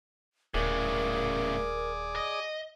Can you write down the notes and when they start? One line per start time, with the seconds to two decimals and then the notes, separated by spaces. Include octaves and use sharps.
0.54 D#1 A2 C#3 G#4 A#4 D5
2.16 D#5